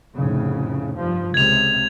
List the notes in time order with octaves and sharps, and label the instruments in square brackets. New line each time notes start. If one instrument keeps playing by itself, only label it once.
[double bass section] F1 A2 C#3
G2 F3
[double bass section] C#2 C3 [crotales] G#6 F7